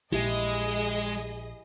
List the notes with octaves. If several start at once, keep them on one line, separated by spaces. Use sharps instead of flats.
A#1 G#3 E4 G4 G#4 D#5